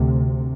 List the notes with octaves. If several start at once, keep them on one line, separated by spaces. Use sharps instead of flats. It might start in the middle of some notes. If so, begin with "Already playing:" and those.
Already playing: D2 C3